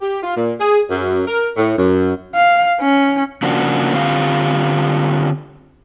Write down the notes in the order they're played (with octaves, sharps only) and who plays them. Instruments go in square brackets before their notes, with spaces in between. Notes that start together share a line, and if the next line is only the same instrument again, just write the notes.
[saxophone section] G4
F4
A#2
G#4
F#2
A#4
A2
F#2
[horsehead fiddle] F5
C#4
[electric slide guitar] C#3 F3 A#3 D4 F#4
D3 C4 F4 G4 F5